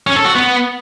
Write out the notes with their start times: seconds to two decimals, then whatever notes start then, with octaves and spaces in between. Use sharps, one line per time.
0.07 C#4
0.16 A4
0.26 F#4
0.35 B3